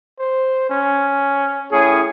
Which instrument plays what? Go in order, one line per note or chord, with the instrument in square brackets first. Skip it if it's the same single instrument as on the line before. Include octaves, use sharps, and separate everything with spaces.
[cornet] C5
C#4
[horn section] A2 C#4 G#4